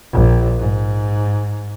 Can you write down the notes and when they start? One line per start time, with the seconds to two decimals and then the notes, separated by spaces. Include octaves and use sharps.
0.13 A#1
0.58 G#2